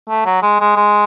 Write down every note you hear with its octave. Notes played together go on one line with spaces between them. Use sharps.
A3
F#3
G#3
G#3
G#3